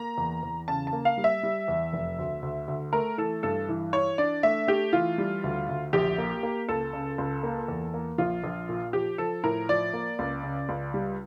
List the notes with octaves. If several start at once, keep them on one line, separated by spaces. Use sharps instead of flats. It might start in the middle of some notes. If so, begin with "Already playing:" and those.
Already playing: A#3 A#5
E2
E2
C#3 A5
A5
A#3
F5
G3
E5
G3
E2
F1
D2
D2
D2
A3 A#4
E3 A4
G2 A4
E3
E3 C#5
D4 D5
A3 E5
A3 G4
E3 F4
G3
D2
D2
A#1 G4
A#3
A#3
C#2 A4
C#3
C#2
A#3
E2
A#3
A#1 F4
A#1
A#2
F3 G4
F3 A4
A2 A#4
F3 D5
A#3
C#2
C#3
C#2
G3